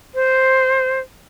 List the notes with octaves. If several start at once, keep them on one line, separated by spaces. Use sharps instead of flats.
C5